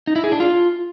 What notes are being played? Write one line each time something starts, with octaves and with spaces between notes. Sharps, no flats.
D#4
E4
G#4
D4
F4